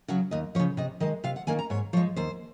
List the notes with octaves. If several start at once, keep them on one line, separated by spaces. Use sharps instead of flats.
C#3 F#3 F#4
D#2 D#5
C#3 F3 C#5
C3 D#5
D#3 G#3 D#5
C3 F5
F#5
D#3 A#3 C#4 G#5
A#5
G#2 C#5
F3 G#3 C#5
D#2 C5